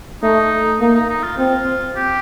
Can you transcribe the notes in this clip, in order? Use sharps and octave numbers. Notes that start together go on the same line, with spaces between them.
A3 D#4
A#3 D#4
D#4
D#4
F4
C4 F4
G4